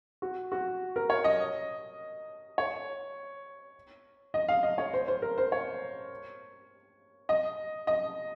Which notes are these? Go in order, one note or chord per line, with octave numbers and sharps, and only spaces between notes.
F#4
F#4
A#4
C#5
D#5
C#5
D#5
F5
D#5
C#5
C5
C5
A#4
C5
C#5
D#5
D#5